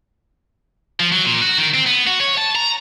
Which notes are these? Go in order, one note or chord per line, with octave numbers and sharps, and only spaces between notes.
F3
F#3
A#2
F#4
D#3
C4
B3
F#4
C#5
A5
A#5